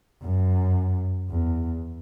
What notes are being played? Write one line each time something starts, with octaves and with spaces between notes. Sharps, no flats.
F#2
E2